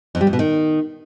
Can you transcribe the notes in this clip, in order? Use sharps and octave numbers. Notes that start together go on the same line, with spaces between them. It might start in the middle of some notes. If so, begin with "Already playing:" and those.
F2
G3
F2
B2
D#3